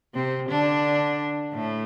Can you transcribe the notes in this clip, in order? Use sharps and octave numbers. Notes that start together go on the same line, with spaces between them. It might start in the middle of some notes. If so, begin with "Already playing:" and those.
C3 C4
D3 D4
A2 A3